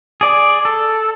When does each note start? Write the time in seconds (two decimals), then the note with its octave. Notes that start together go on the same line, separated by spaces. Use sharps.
0.21 G#4 D5
0.65 A4